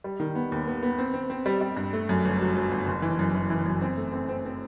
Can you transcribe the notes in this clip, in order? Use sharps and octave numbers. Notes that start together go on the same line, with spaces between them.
G3
D#3
B3
D#2
B3
B3
C4
C4
C4
G3
G3
G2
A3
F#2
G1
F#3
F#3
G1
F#1
E3
F#2
E3
E3
F#2
C4
A3
C4
C4
C4